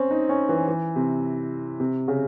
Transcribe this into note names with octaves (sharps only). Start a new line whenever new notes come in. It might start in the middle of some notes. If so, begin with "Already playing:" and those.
Already playing: C4 C#4
D#4
C#4
E3
E3
C3
C3
C#3